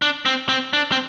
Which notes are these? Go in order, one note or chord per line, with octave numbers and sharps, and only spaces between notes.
D4
C4
C4
D4
C4